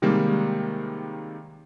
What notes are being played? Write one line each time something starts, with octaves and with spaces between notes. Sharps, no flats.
C3 D#3 G3 G#3 A#3